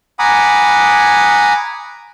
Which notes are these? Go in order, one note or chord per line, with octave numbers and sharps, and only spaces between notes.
F#5 G#5 A#5 B5 D6 D#6